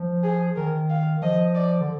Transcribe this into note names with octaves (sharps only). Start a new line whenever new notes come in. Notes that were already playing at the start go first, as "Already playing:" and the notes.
Already playing: F3
G#4
D#3 A#4
F5
F3 D#5
D5
D3